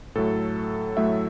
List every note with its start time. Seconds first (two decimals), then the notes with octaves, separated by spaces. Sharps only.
0.15 A2 F#3 A3 A4
0.97 A2 F#3 A3 E5